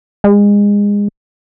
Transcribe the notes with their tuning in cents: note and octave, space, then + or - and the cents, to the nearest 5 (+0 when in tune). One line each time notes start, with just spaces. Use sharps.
G#3 -25